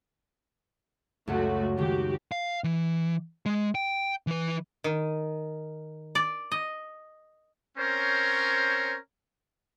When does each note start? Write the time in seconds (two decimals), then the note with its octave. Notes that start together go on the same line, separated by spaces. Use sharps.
1.27 C#2 F#2 A3 F#4 F#5
1.77 C#2 D#3 F#4 G4
2.32 F5
2.64 E3
3.46 G#3
3.75 G5
4.27 E3 B4
4.84 D#3
6.15 D5
6.52 D#5
7.78 C4 C#4 A#4 C5 C#5